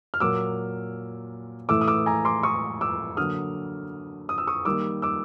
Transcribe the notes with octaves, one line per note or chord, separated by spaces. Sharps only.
F6
A#2 F#3 A#3 D6 E6
A2 E3 A3 D6 E6
D#6
D6 E6
G#5 A#5
C6 D6
C#6 D#6
D6 E6
D3 F#3 A#3 D#6 F6
D#6
E6
C#6 D#6
D#3 G3 A#3 D6 E6
D6 E6